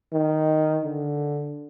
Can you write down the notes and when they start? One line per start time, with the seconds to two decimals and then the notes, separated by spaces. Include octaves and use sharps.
0.13 D#3
0.85 D3